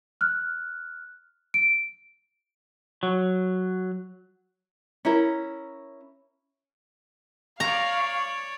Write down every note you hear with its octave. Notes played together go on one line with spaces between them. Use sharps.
F6 F#6
D7
F#3
C#4 E4 A#4
C#5 D5 F5 A#5 C#6